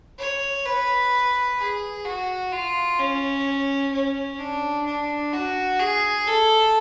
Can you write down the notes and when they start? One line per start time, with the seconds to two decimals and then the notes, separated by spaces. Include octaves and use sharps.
0.19 C#5
0.66 B4
1.58 G#4
2.05 F#4
2.52 F4
2.99 C#4
3.93 C#4
4.39 D4
4.86 D4
5.33 F#4
5.80 G#4
6.27 A4